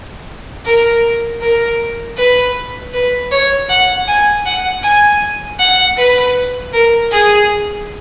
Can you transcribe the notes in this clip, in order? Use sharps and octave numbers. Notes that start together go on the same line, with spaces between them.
A#4
A#4
B4
B4
C#5
F#5
G#5
F#5
G#5
F#5
B4
A#4
G#4